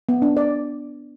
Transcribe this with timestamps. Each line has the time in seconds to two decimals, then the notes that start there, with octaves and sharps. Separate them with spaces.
0.09 B3
0.22 D4
0.37 D5